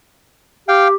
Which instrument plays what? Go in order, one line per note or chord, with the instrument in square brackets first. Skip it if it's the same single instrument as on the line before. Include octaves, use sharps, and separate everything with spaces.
[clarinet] G4 [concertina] F5 G5